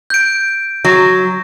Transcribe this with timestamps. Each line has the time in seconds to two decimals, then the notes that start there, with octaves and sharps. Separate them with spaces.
0.10 G6 D7
0.85 F#3